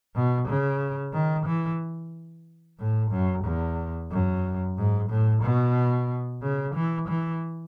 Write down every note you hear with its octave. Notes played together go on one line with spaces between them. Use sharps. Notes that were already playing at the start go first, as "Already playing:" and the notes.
B2
C#3
D#3
E3
A2
F#2
E2
F#2
G#2
A2
B2
C#3
E3
E3